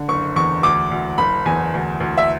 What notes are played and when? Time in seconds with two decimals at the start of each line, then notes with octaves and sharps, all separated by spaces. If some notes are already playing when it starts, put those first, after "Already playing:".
Already playing: D3
0.08 F#1 C#6
0.36 E2 C#6
0.63 D2 D6
0.91 D2
1.18 F#1 B5
1.46 E2 G#5
1.74 D2
2.00 D2
2.18 E5